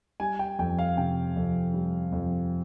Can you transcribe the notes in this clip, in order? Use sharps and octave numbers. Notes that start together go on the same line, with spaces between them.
G3 G#5
G5
F2 G5
F5
C3 G5
F2
G3
F2